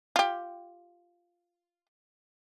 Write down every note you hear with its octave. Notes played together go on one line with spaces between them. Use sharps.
F4 G4